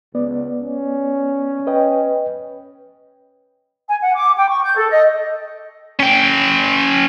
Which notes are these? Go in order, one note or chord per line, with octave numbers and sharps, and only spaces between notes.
C#2 B3 D5
C#4
B4 D#5 G5
G#5
F#5
D6
G5
C#6
G6
A4
D#5
C#4 G5